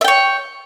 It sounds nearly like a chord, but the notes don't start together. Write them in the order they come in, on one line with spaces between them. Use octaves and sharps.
E5 G5 C#5